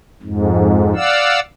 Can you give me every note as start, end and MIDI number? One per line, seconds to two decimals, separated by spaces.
0.23 0.94 41
0.23 0.94 44
0.95 1.40 74
0.95 1.40 77
0.95 1.40 78
0.95 1.40 88